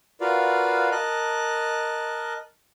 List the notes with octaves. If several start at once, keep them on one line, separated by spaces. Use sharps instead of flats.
F4 F#4 A#4 B4 D5 F5
A#4 D#5 A5 F#6